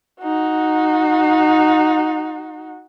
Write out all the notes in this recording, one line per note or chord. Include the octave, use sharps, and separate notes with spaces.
D#4 F#4